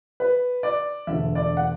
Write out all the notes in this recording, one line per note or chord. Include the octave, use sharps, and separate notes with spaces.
B4
D5
E1 D2 D3 E5
D5
F#5